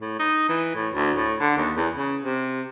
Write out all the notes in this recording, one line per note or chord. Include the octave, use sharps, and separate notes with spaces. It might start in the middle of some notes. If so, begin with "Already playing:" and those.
A2
D#4
E3
A2
D2
A2
D3
D#2
E2
C#3
C3